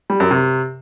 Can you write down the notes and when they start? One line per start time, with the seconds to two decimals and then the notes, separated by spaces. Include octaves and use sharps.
0.10 G3
0.20 F#2
0.31 C3